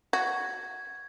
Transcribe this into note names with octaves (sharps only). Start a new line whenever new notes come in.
F#4 G#6